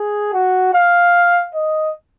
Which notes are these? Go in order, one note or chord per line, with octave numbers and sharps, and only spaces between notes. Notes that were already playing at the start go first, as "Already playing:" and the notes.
Already playing: G#4
F#4
F5
D#5